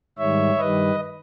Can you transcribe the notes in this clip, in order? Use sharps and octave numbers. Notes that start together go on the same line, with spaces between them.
G#2 D#3 G3 C#5 E5
G2 D#3 G3 B4 D#5